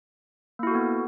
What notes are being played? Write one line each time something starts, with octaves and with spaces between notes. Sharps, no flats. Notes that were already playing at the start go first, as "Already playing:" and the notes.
A#3 B3 E4 F#4 A4